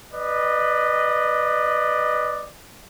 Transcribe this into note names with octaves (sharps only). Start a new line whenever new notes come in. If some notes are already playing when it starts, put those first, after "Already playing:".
B4 D5 D#5